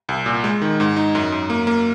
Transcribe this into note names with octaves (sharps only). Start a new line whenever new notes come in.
C2
A#2
G#3
D#3
G#2
D#4
F#2
F#2
A#3
A#3